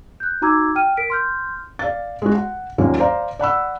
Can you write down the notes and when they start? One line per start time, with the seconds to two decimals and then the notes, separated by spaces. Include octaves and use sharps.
0.20 F#6 G6
0.42 D#4 F#4 A#5 D6 E6 G#6
0.75 G5 F6 D#7
0.97 A#4 B6 D7
1.10 C6 F6 G6
1.79 D5 F5 A6
2.22 G#3 F#4
2.35 F#5
2.78 D#2 A#2 D#3 F#3 A#3 C#4
3.00 C5 D5 F5 A#5
3.39 D5 F#5 B5 E6